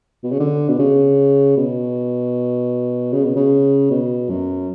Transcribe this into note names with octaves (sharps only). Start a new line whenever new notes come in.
B2
C#3
D3
B2
C#3
B2
C#3
B2
C#3
B2
F#2